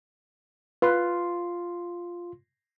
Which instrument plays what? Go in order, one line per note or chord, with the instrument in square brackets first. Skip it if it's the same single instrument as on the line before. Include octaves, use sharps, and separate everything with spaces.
[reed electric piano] F4 C6 [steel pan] B4